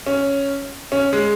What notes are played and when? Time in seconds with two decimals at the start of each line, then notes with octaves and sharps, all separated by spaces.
0.06 C#4
0.92 C#4
1.13 G#3